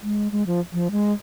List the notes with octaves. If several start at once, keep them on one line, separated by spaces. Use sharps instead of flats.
G#3
G#3
F3
F3
G#3